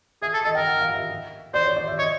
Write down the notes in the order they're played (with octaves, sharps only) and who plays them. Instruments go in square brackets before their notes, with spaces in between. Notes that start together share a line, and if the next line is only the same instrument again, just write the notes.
[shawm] G#4 [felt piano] E5
[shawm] A4
[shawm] A4 [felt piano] D#5
[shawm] A#4 [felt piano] G5
[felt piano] F#5
F5
E5
[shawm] C5 [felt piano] D5
[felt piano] C#5
D5
E5
[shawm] C#5 [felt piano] D#5